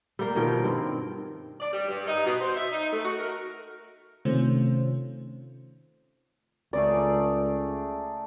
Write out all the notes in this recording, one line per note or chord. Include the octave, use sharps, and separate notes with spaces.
G3 A#3
B2 D#3 F3 G5
G2 C4
D5
G3
G2
D#4
B2
C5
E5
D#4
A3
F#4
A#4
C3 D#3 A3 C#4 F4 C5
C#2 A3 G#4 A#4 D5